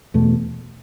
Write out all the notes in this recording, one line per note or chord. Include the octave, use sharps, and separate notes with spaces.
E2 B2 A3